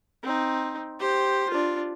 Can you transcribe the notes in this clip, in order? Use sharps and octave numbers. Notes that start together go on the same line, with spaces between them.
C4 D#4
G4 C5
D4 F4